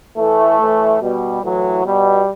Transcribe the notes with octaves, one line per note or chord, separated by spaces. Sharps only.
A2 E3 A3
A2 E3
B2 G3
A2 E3 F#3
B2 G3